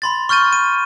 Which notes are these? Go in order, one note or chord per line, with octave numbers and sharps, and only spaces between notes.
B5 C6 A6
C#6 F6 G6 A6 D#7
D#7